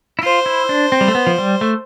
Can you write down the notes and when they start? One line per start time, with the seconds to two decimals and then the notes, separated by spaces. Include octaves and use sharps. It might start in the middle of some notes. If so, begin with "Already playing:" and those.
0.19 E4
0.23 F4 C5
0.46 E4
0.69 D4
0.92 C4
1.01 G3
1.08 A3
1.15 B3
1.27 F3
1.38 G3
1.61 A3